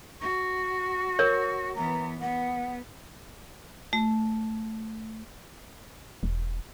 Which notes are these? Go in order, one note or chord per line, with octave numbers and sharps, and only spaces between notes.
F#4 C#6
A#4 C#5
E3 B3 A#5
B3 F#5
A3
E1